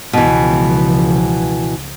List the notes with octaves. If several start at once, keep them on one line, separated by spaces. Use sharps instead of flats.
C#2 B2 E3 F3